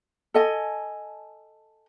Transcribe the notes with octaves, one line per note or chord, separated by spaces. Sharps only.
A4 D#5 G#5